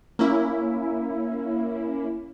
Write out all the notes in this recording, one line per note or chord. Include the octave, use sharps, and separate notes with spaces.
A#3 C#4 E4